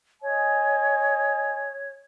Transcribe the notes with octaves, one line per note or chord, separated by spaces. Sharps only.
C#5 D#5 G#5